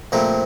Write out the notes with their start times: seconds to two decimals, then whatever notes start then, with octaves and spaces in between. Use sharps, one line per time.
0.12 A#1 A#2 A3 C4 A#5